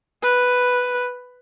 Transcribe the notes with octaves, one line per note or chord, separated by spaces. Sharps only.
B4